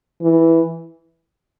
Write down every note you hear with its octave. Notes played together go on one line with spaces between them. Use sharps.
E3